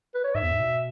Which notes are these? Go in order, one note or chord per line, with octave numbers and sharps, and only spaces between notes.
B4
C#5
G#2 E5
E2
G#2
B2